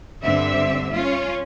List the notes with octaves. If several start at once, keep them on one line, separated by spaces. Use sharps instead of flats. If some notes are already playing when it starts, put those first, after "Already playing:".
G2 D3 C4 E5
C#4 F4